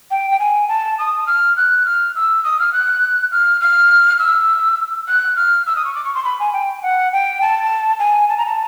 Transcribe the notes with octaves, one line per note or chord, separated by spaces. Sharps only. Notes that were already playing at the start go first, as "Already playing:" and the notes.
G5
G5
G#5
A5
D#6
F6
F#6
F6
E6
D#6
F6
F#6
F6
F6
E6
F#6
F6
E6
D#6
C#6
D6
C#6
C6
B5
G#5
G5
F#5
G5
A5
G#5
A5
A#5
A5